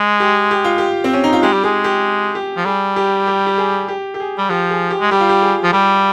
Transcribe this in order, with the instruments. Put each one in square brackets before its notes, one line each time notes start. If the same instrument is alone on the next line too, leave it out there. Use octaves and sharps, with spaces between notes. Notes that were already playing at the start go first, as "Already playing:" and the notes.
Already playing: [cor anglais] G#3
[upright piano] G4
G4
F4
G4
C4
C#4
D#4
F4
[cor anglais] G#3 [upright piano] G4
[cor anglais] G3
[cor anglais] G#3 [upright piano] G#4
[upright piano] G4
G4
[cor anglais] F3
[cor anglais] G3 [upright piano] G#4
[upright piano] G4
G4
G4
G#4
G4
G4
G#4
[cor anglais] G3
[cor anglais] F3 [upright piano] G4
[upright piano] G#4
G4
[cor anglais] G#3
[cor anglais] G3 [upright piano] G4
[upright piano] F4
G4
G#4
[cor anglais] F3
[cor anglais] G3 [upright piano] G4